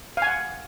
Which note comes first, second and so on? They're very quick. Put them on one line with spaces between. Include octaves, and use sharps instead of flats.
F5 G#5 F#5